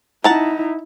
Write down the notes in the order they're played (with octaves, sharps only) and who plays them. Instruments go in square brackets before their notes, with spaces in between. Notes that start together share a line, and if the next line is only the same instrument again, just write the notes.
[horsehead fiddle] D#4 E4 [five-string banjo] F#5 A5 A#5